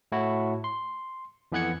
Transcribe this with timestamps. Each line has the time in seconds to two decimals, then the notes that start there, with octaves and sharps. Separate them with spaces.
0.12 A2 E4 F#4
0.64 C6
1.52 F2 E3 B3 F#6 G#6 C#7